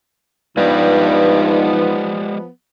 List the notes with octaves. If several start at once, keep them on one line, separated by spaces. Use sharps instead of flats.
G2 F3 G#3 B3 D#4 G4 D5